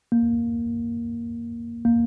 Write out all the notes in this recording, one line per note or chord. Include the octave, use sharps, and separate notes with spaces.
A#3
A#3